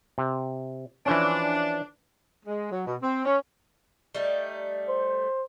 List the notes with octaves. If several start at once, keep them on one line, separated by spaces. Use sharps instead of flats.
C3
E3 F3 C#4 D4
G#3
F#3
B2
C4
C#4
G3 A3 D#4
C5